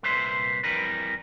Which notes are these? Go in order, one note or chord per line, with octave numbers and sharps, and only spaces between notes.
C2 A#2 B4 C5 E5 C6
F2 E3 G3 A#4 B4